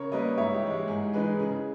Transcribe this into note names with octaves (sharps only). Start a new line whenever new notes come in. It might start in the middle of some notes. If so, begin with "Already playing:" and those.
Already playing: C#3 A#4 C#5
G3 A#3 B4 D#5
G#2 C#5 E5
G4
E3 G#3
G4
G#2 G#4
E3 G#3 D#4 G#4 B4
C#3 G#4